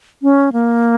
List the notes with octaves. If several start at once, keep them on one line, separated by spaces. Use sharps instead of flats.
C#4
A#3